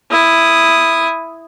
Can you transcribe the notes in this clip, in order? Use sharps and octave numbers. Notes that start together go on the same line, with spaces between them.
E4 D#6